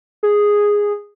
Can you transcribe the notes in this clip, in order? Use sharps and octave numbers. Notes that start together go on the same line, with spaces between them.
G#4